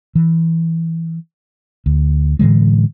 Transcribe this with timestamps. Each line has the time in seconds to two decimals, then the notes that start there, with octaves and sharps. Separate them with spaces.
0.15 E3
1.86 D2
2.39 A2 D3 E3 G#3